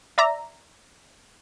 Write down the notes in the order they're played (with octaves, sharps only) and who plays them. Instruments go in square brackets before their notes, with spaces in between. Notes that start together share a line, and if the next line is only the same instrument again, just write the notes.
[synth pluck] D5 E5 A#5